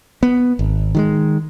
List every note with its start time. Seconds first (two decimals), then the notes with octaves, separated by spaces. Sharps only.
0.23 B3
0.59 G#1
0.95 D#3 F#3 G#3